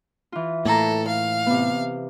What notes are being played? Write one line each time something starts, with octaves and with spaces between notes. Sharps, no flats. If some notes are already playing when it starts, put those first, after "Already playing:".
E3 F4
A2 A#3 A4 A#5
F5
C3 B3